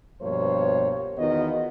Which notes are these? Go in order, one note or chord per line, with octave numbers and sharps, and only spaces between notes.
G2 B2 F3 A#3 C5 C#5
E2 D#3 B3 F4 F#4 D#5